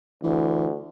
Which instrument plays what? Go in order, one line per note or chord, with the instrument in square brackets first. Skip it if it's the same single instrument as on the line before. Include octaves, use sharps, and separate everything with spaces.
[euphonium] D2 [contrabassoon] E3